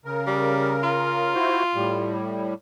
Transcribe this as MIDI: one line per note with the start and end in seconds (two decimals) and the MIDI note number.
0.05 1.34 49
0.05 1.34 70
0.27 0.77 55
0.84 2.16 65
1.35 1.63 64
1.35 1.63 66
1.35 1.63 72
1.75 2.54 45
1.75 2.54 55